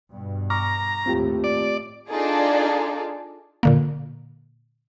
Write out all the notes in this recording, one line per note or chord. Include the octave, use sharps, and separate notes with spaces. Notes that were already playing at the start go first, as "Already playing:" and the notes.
G2 B2
A#5 C#6 D6 F6
D#2 A2 A3 C4 F4 G4
D5
D4 D#4 F4 G#4 A4 D5
A#2 D3 A#3